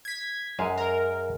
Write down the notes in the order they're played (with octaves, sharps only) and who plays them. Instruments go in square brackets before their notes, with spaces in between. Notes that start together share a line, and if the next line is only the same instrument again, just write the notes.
[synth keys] G#6 B6
[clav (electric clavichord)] F#2 F5 G#5 [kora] G#3
[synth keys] A#4